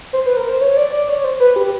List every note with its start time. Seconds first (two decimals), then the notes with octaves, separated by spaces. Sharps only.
0.13 C5
0.26 B4
0.37 A#4
0.49 C5
0.61 C#5
0.77 D5
0.92 D5
1.09 C#5
1.24 C5
1.40 B4
1.56 G4